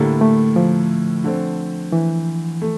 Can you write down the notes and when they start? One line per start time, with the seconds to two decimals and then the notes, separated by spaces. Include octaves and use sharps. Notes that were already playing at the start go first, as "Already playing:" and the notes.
Already playing: A2 D3 G3 A#3 E4 A4
0.21 A3
0.56 F3
1.24 D3 A3 C4
1.92 E3
2.62 A3